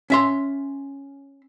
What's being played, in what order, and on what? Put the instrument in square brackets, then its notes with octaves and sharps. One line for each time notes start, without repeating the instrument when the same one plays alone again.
[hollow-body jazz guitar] C#4 E5 C6